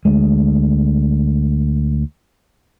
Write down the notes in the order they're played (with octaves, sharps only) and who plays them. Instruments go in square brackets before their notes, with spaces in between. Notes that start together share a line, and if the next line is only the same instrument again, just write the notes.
[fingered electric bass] D2 G#3